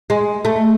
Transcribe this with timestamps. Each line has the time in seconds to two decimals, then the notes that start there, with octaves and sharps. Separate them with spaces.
0.10 G#3
0.45 A3